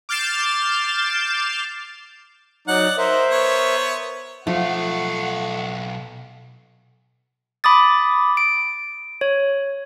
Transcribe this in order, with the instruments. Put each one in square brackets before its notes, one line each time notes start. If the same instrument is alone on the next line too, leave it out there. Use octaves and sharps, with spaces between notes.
[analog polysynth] D6 F6 G6 A6 C7 E7
[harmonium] F#3 D#4 [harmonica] D5 F#5
[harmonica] D#4 [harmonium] A#4 C5 E5
[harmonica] B3 C#5
[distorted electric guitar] B1 F5 [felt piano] F3 [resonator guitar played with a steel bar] A3 [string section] F#5
[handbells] B5 D6 D#6 A6
D7
C#5